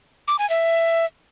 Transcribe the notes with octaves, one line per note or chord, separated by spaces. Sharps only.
D6
G#5
E5